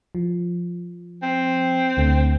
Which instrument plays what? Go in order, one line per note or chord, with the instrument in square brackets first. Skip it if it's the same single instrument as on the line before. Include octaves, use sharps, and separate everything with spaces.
[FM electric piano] F3
[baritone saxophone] C4
[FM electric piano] D2 D3 A3